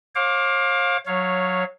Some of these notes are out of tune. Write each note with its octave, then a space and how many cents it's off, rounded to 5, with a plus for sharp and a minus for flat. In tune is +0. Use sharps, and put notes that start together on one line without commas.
C#5 -45 F5 +20 D6 +0
F#3 -15 C#5 +0 F5 +0